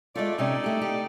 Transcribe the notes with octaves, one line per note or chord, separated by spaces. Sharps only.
G#3 A3 F4 D5
C3 C#4 D#4 A4 D5
A3 G4
G4